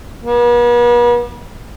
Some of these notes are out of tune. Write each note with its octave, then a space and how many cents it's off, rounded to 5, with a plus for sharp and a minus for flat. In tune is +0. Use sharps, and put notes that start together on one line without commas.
B3 -45